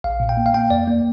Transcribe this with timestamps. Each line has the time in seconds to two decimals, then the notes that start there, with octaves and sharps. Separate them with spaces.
0.04 A#1 F5
0.20 A#2
0.29 G5
0.37 A#3
0.46 F5
0.54 A#3 G5
0.70 F2 D5
0.88 A#3